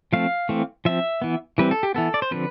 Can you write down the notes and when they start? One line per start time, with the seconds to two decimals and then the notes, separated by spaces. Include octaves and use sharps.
0.13 F3 A3 C4 F5
0.49 E3 A3 C4
0.85 F3 C4 E5
1.22 E3 B3
1.58 E3 G3 C4 B4
1.71 A4
1.83 G4
1.94 E3 B3 A4
2.14 D5
2.22 C5
2.31 D3 F3 C4 B4